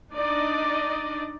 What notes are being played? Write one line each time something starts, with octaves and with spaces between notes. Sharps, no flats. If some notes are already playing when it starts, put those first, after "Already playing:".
D4 D#4 D5 D#5